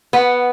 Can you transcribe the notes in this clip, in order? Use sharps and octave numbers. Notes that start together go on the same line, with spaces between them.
B3